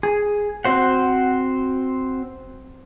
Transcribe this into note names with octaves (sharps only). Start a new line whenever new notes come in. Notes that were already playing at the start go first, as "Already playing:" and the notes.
G#4
C4 F#4 C5 F#5